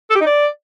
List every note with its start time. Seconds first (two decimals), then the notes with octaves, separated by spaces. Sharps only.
0.10 A4
0.16 G4
0.21 D#4
0.27 D5